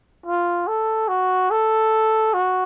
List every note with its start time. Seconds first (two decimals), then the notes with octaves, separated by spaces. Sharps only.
0.26 F4
0.68 A4
1.08 F#4
1.51 A4
2.34 F#4